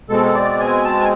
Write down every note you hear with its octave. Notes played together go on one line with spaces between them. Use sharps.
B2 G#3 C4 A4
D5
G#5
A5
G#5